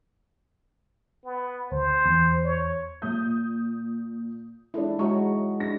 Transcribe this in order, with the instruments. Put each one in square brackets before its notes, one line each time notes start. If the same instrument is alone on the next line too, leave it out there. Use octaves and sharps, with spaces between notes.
[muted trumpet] B3
[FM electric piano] D2 [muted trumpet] C5
[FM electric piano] E2
[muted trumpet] C#5
[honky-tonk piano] A#2 D#6 G6
[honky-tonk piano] G#3 D4 [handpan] E4 A4
[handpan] G#3 F#4 [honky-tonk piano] C#5 A#5 C#6
[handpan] D4 [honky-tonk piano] A#6